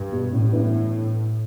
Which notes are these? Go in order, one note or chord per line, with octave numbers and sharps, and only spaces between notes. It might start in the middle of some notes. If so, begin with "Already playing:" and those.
Already playing: G2
B2 G3
A1 A2
G2 E3 B3